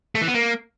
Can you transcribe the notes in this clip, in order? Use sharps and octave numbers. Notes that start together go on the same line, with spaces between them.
A3
E3
B3
A#3